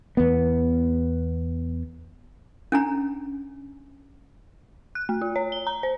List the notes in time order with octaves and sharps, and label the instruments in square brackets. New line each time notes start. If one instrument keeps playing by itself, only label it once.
[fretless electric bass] E2 B3
[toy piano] C#4 D4 A#5
[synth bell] F#6
A3
F4
C#5
G7
A#5
C5